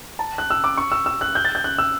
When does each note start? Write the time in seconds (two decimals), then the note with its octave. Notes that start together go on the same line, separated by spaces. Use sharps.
0.19 A5
0.38 F#6
0.50 E6
0.64 D6
0.77 C#6
0.92 E6
1.06 E6
1.21 F#6
1.35 G6
1.45 A6
1.55 G6
1.64 F#6
1.79 E6